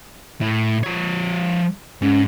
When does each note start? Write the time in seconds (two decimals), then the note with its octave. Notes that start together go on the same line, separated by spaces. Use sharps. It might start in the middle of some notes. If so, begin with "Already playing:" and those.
0.41 A2
0.84 F3 C#5
2.02 G#2 C#4